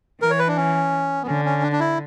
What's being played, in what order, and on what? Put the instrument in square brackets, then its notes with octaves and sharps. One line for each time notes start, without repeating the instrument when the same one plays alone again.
[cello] E3 [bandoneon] A#4
[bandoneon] C#5
B4
D4
C#4
B3
[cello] D3 [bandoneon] C#4
[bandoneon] C#4
D4
D4
E4